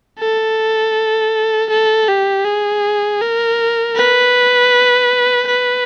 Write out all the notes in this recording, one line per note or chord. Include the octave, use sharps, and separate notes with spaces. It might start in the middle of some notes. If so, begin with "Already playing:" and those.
A4
A4
G4
G#4
A#4
B4
B4